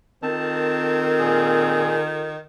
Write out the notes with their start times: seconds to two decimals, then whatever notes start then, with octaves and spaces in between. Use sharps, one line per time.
0.23 D#3 C4 F4 A4 A#4 A5
1.19 A#2 G#4